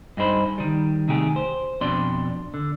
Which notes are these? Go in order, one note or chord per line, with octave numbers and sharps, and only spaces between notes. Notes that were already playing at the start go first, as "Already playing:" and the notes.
G2 D#4 G#4 C5 B5
D#3 G3
C3 D#3 A3 G4 G#4
C5
F2 B2 D4 D5 C6
D3